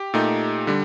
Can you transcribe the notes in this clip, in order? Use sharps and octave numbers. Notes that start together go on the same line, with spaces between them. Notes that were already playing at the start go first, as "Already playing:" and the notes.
Already playing: G4
A#2 A3 D#4
D3 G3